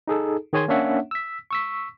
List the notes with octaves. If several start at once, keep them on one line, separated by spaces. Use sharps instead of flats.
D#4 G#4 A4
D#3 G#4 C#5 G#5 C6 G#6
A#3 C#4 D4 C#5 E5 F#5
E6 B6
C#6 E6 B6